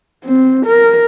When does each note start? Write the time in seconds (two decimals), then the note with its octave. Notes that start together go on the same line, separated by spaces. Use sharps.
0.24 C4
0.66 A#4